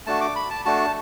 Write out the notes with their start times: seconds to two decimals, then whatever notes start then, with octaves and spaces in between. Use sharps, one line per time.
0.06 A3 D4 F#4 A5
0.21 D6
0.36 B5
0.50 A5
0.65 A3 D4 F#4 A5